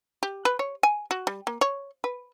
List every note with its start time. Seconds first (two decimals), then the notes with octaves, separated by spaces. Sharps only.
0.23 G4
0.45 B4
0.59 C#5
0.83 G#5
1.11 F#4
1.27 G3
1.47 A#3
1.61 C#5
2.04 B4